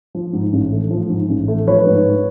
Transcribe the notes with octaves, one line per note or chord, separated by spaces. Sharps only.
F3
G#2
A1
A3
F3
G#2
A1
A3
F3 B4 C#5
G#2